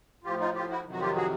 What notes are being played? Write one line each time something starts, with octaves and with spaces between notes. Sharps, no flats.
A2 F3 F4 G4
D#4 F4
F4 G4
E4 F#4
F2 C3 D#3 F#3
F#4
F4 G4
F#4 G#4